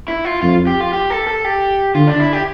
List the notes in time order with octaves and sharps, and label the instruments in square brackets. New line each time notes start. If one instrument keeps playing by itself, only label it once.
[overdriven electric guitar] E4
F4
[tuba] F2 [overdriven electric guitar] F4
[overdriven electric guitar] G4
F4
G4
A4
A4
G4
[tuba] D3 [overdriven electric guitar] F4
[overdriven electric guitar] D4
E4
G4